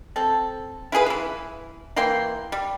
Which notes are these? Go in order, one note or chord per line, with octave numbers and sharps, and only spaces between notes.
C4 A4
E4 F4 G#4 B4
E3 E4
E3 A#3 G5 C6
G3